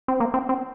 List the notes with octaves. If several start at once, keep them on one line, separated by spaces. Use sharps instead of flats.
C4
A#3
C4
C4